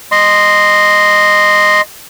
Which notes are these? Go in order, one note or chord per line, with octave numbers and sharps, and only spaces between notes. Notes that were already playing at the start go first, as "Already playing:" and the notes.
D#5 C6